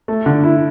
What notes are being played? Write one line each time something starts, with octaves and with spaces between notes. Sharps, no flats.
A3
D3
E4